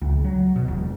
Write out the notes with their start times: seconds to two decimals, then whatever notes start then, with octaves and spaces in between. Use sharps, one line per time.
0.02 C#2
0.24 F#3
0.56 B2
0.68 E1